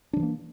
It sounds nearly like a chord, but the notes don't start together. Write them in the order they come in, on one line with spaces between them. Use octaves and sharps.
D4 F3 E3 A#3